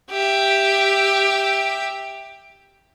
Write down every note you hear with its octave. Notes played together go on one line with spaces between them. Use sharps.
G4 E5